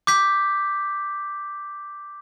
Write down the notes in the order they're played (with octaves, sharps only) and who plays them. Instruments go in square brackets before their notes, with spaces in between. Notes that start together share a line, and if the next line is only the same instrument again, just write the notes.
[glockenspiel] D6 G6 B6